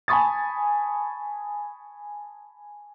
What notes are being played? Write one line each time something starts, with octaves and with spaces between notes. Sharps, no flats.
G#5 A5 B5 C#6 D#6 A6